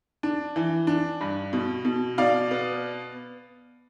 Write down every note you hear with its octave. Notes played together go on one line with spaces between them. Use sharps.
D4
E3
D4
G2
B2
B2
B2 D5 F5
B3